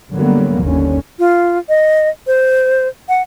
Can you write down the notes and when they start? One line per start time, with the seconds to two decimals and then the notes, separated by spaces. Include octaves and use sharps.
0.13 D3 F#3 G3 A#3 B3
0.60 G1 D#2 D3 C#4
1.19 F4
1.69 D#5
2.27 C5
3.09 F#5